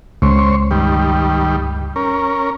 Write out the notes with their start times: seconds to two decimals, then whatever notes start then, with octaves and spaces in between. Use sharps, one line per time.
0.22 C#2 C5 C#5
0.71 G2 D#3 G3
1.96 C#4 A#4